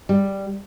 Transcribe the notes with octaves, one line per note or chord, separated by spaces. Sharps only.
G3